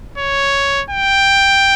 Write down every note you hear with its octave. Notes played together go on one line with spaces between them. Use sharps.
C#5
G5